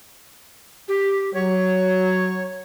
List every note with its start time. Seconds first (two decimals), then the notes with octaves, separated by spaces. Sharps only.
0.88 G4
1.34 F#3 C#5